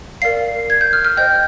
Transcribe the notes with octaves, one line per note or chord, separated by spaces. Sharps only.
A#4 D5 F5 C7
G#6
G6
F6
F6
C5 D#5 G5 G6